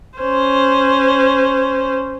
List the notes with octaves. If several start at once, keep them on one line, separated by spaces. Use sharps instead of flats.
C#4 C5